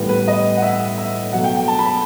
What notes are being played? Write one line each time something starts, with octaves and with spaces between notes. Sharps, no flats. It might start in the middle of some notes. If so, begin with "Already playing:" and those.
Already playing: A2 E3 G3 B3
B4
D#5
F#5
E5
E5
B2 F#3 A3 F#5
G5
G5
A5
B5